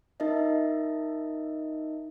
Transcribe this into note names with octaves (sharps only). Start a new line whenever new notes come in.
D#4 A#4 D#5 E5